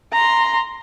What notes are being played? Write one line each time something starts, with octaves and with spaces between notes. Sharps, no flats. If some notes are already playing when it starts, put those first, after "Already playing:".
A#5 C6